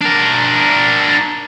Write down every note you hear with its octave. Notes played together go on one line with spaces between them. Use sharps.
D4 A#4